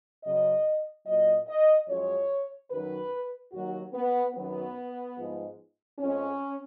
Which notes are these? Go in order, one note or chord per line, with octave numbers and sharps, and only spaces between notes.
F#2 C#3 F#3 D#5
A#2 F#3 D#5
D#5
F#2 F3 G#3 C#5
F#2 D#3 F#3 B4
D#2 D#3 F#3 F#4
B3
F#2 D#3 F#3 B3
G#2 F3 G#3
F2 F3 G#3 C#4